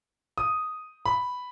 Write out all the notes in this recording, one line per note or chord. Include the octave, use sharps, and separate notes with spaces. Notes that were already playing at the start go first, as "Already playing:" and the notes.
D#6
B5